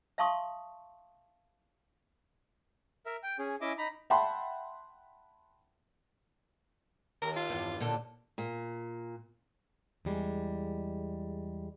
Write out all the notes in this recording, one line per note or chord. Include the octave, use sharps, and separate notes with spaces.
E5 F5 A5 C6 C#6 D#6
A#4 E5
G5
C#4 G#4
C#4 E4 D#5 E5 D6
D#4 A#5 B5
E5 F#5 G5 A5 B5 C6
D#2 A#4
F4
E2 G2
A#2 D3 A4
A#2
E2 G3 G#3